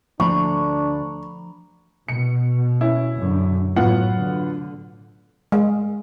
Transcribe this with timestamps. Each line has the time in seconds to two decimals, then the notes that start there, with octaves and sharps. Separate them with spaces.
0.20 D2 F3 D4 A#5 B5 C#6
2.08 B2 C#7
2.81 C#4 E4
3.17 F#2 D3
3.76 A2 F#3 B3 F4 F#5
4.16 D3
5.52 G#3